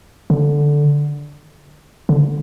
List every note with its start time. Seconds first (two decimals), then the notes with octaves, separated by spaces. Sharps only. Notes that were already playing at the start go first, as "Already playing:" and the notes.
0.30 D3
2.09 D3